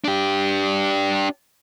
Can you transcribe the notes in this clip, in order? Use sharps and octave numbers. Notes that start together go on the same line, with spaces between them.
D4 G4